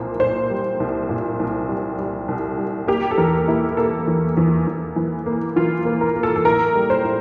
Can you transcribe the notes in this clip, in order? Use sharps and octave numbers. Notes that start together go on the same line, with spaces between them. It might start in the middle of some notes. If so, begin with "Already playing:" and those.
Already playing: C2 A#2 A#3 C5
A#2 C5
G3
C2
A#2
C2
G3
G3
C2
G3
A#3 G4
A4
E2 A#4
A#3 E4
A#3 A4
E2
E2
E2
E3
A#3
E3 F4
A#3
A#4
A#3
A4
A4
A2 A#4
G3
C5
A2